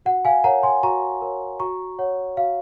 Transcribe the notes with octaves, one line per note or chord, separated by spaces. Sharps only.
F#4 F#5
F5 G#5
A#4 C#5 F#5 A#5
G#5 C6
F#4 A#5 C#6
A#4 C#5
F#4 A#5 C#6
C#5 F#5
F#4 F5